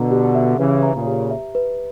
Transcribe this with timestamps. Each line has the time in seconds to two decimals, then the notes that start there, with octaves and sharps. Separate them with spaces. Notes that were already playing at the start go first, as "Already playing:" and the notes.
Already playing: B2 D3 A#5
0.11 G4
0.35 E5
0.59 C#3 E3 B4
0.83 A#5
0.94 A#2 C#3
1.07 G4
1.31 E5
1.55 B4